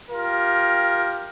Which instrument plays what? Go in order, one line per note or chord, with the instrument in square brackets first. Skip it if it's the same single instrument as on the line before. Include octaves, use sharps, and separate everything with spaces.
[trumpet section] F4 G4 A#4